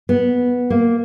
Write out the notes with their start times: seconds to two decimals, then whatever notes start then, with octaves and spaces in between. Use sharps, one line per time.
0.09 B3
0.70 A#3